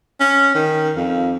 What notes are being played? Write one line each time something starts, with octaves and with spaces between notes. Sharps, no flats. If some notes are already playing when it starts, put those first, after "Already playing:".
C#4
D#3
F2